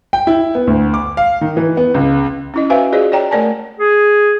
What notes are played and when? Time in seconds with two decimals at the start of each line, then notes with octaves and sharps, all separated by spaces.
0.13 G5
0.27 E4
0.55 B3
0.67 D2
0.94 D6
1.17 F5
1.41 D#3
1.57 E3
1.77 B3
1.94 C#2
2.54 C#4 E4 D#5
2.70 F#4 B4 C5 E5 F5 G#5
2.92 F4 F#4 G#4 C5 D5 D#5
3.12 C#5 D5 G5 A#5
3.31 A3 A#4 D5 G#5 A5
3.80 G#4